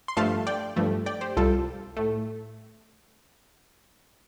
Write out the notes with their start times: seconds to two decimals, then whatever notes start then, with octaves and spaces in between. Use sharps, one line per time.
0.08 C6
0.17 G2 F3 A3 F5 A5
0.47 D5 G5
0.76 G2 F3 A3
1.06 D5 G5
1.21 G4 C5
1.37 C2 C3 G3 F4 A4
1.97 A2 A3